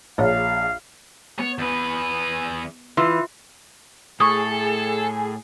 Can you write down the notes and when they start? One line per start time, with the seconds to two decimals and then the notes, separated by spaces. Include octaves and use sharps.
0.18 A#1 G#4 C#5 E5 F5
1.39 B3 C#5
1.58 E2 B4
2.97 E3 F4 E5 C6
4.20 A2 G#4 A4 C#6 D#6